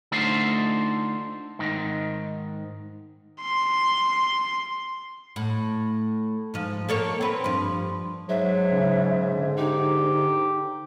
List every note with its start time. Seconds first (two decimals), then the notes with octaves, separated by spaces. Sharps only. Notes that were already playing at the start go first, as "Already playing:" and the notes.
0.12 D3 A3 D#4 F4 A4 C5
1.59 G#2 D#3
3.42 C6
5.36 A2
6.54 G#2 F3
6.89 A#3 A4 C#5
7.21 C4 B4
7.44 G2 F3
8.29 G#2 F#3 E5
8.72 C#3
9.34 D3
9.57 D#4 G4